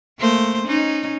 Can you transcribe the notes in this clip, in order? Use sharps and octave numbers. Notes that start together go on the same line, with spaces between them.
A3 A#3 C5
C#4 D#4